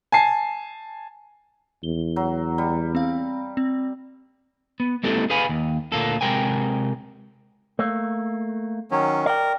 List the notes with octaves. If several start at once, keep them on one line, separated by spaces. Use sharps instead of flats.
G#5 A5 C7
E2 G7
F#3
G3
C4 F5
C4
B3
G#3 A#3 C4 E4 G4 A4
G#4 B4 F5 G#5 B5
D#2
D2 A#2 A#3 A4
C3 F#3 G#3 A#4 G5 G#5
A3 A#3
D#3 F#3 C#4
A#4 D5 G5